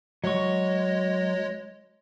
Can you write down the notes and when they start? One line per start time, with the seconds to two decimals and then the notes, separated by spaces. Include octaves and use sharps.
0.24 F#3 G#3 C#5 D#5 C#6